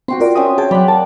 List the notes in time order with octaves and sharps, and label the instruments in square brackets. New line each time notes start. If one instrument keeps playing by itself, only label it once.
[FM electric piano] C4 [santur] F#4 G5 C6
[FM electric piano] F4 A#4 D5
[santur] C4 C#4 E5 [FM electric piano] D#6
[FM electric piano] G#4 A5 [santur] G5
[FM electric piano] F#3 B5 [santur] D5 F#5
[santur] A#3 [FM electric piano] A5